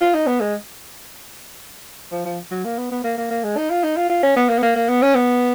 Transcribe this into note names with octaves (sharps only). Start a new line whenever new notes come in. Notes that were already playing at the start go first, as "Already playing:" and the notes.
F4
D#4
B3
G#3
F3
F3
F#3
A#3
B3
B3
A#3
A#3
A#3
G#3
D#4
F4
D#4
F4
F4
C#4
B3
A#3
B3
A#3
A#3
B3
C#4
B3